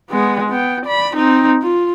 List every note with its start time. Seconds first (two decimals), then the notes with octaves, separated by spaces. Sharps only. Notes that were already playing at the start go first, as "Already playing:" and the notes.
0.10 G#3 B3
0.49 B3 G5
0.86 D5 B5
1.15 C4 D#4
1.62 F4